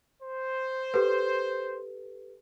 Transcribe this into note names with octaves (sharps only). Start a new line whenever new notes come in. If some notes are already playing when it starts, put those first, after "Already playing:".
C5
G4 A4 B4